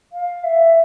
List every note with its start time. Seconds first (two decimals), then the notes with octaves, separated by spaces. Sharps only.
0.12 F5
0.43 E5